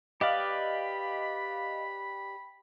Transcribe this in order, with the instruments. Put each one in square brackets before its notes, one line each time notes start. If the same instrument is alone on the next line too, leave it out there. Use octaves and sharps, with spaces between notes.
[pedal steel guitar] G4 B4 D5 [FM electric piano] D#5 F5 [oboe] B5